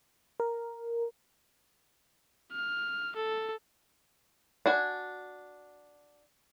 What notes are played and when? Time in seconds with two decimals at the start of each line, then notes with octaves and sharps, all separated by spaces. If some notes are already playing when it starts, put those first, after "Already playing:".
0.40 A#4
2.52 F6
3.16 A4
4.66 D4 F#4 G#5